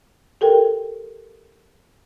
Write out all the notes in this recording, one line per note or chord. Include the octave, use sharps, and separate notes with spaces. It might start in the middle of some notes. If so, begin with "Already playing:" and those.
G4 A4 A#4 G5